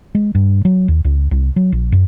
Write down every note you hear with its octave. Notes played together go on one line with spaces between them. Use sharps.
G#3
G2
F#3
D#2
C#2
C2
F#3
A#1
F#2